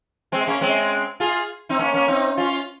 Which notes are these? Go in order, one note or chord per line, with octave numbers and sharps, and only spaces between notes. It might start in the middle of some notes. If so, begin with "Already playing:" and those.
G#3 C4
A#3 C#4
G#3 C4
F4 G#4
C4 D#4
A#3 C#4
A#3 C#4
C4 D#4
C#4 F4